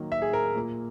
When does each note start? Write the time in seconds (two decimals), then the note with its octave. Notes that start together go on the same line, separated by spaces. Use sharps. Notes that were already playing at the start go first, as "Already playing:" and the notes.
Already playing: D#3 F#3 A#3
0.12 E5
0.22 G#4
0.33 A#4
0.55 A#2 A#3